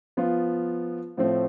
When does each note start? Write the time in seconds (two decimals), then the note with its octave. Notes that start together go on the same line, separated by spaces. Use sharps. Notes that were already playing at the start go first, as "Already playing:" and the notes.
0.17 F3 B3 F4
1.17 A2 F3 A3 C4